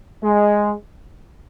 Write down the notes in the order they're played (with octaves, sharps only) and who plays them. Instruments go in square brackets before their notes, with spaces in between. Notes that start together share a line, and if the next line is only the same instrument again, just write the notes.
[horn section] G#3